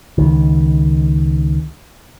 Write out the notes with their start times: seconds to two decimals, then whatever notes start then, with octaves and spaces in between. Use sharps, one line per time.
0.18 C#2 D#3